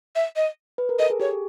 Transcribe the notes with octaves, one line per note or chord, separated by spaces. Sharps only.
E5
D#5
B4
A#4
A4 D#5
G#4
G4 C#5